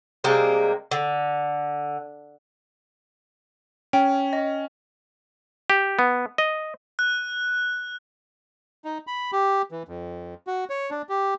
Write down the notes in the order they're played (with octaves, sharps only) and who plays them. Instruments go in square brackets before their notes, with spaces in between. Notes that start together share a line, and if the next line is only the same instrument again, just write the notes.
[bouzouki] C3 G3 G#3 A#3
D3
[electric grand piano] C#4 [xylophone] G5
[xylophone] D#5
[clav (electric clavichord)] G4
B3
D#5
[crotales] F#6
[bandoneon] D#4
B5
G4
E3
F2
F#4
C#5
D4
G4